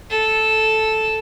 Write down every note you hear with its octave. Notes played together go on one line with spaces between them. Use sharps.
A4